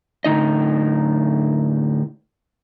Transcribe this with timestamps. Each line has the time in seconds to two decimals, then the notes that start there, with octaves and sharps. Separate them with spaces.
0.25 A2 D3 D#4 D#5